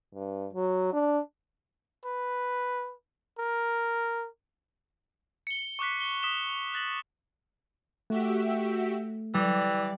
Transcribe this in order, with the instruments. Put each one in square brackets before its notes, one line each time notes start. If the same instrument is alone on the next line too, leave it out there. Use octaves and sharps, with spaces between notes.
[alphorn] G2
F#3
D4
[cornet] B4
A#4
[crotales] C#7 G7
C#6 D6 F#6 B6
C#7 G7
D#6 B6 E7 G7
F#6 A6 A#6 F#7
[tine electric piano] A3 [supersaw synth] F#4 G4 E5
[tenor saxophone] E3 [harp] G3 [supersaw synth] D5